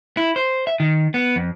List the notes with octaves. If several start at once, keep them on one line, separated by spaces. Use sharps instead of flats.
E4
C5
E5
D#3
B3
F2